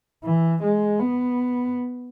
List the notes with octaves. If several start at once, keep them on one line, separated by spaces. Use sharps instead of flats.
E3
G#3
B3